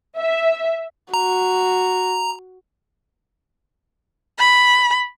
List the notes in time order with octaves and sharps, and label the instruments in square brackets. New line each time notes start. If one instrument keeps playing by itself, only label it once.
[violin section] E5
[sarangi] F#4 [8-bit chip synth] A#5
[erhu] B5